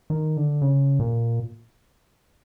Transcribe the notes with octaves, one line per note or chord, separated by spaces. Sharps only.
D#3
D3
C#3
A#2